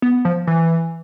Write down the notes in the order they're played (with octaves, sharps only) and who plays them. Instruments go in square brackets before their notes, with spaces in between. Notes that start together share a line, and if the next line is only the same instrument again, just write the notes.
[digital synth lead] B3
F3
E3